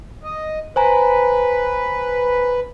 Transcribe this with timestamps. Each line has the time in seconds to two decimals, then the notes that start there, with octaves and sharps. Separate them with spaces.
0.23 D#5
0.76 B4 C5 G#5 A#5